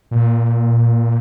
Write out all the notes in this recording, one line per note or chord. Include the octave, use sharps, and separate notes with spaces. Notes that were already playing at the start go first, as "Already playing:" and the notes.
A#2